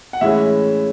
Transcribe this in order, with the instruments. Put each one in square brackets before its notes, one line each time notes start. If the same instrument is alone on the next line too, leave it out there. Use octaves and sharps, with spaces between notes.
[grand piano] F#5
A2 E3 G#3 C#4 E5